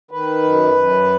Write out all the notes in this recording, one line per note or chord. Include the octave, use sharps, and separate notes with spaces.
D#3 B4
F#2
F#2